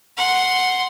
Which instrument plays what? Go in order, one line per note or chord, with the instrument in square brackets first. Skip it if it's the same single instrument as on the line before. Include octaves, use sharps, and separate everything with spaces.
[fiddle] F#5 C6